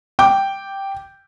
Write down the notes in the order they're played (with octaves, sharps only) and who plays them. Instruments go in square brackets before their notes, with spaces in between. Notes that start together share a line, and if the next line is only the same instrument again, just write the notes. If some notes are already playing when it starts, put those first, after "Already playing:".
[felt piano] G5 D6 G6